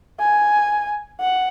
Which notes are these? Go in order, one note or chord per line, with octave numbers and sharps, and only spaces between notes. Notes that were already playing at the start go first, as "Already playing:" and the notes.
G#5
F#5